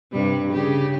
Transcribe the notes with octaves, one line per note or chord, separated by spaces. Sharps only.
G2 C3 G3
C#3 G4